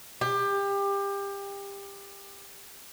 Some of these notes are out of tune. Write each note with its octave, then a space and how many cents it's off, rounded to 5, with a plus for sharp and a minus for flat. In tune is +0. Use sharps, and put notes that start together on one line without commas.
G4 +25